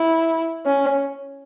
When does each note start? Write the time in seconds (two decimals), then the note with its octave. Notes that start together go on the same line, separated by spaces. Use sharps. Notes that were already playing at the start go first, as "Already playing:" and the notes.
Already playing: E4
0.66 C#4